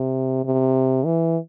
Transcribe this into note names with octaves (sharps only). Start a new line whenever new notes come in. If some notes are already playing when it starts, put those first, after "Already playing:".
Already playing: C3
C3
E3